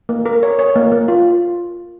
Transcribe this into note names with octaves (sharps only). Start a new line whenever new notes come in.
A#3
A#4
C#5
C#5
A#3
A#3
F4